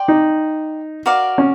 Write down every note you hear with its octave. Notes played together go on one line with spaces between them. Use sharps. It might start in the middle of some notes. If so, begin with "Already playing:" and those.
Already playing: D5 G5 C6
D#4
F#4 A#4 D5 F5
C#4